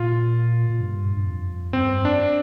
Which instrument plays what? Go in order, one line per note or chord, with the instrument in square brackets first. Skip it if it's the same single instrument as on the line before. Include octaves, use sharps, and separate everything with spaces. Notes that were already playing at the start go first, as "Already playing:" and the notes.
Already playing: [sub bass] A#2 [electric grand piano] F4
[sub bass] A#2
G2
G2
F2
[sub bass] G2 [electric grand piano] C4
[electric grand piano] D4